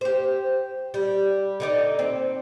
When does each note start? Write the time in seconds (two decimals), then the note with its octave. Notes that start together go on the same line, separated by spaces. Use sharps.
0.01 G4 C5
0.94 G3
1.60 D3 D#4 D5
1.99 C4